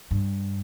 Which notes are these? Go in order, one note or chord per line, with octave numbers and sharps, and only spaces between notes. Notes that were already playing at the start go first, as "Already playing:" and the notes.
G2